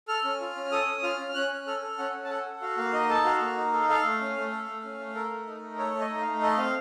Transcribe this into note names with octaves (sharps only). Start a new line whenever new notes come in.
A4 F6
C#4
F4
C#4
A4 D#6
C#4
F4 F6
C#4
C#4 F#6
C#4
A4 F6
A4
C#4 F#5
C#4
A5
A4 F#5
A4
F#4 F5
A#3 F5
D#4 D#5
A4 A5
F#4 F5
A#3
D#4
A4
A4 F5
A3
C#4
A3
A4
A3
C#4
A3
A4 A#4
A3
D#4
A3
A4 C#5
A3
D#5
D#4
F5
A3
A4 D#5
C4 F5